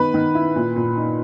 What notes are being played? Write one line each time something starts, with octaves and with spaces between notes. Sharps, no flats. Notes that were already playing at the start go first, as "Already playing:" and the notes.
Already playing: D#3 B3 B4
D#3
E4
A#2
A#2
D#4